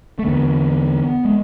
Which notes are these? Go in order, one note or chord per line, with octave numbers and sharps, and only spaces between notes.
A3
E2 D3 B3
G#3